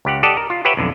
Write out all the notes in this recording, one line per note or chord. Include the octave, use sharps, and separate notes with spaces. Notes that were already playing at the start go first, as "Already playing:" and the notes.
C#2 G4 F#5
G4 A4 D5 D#5 F#5 A5
A#4
F4
G4 B4 C#5 E5 F#5 G5
B1 F2 D3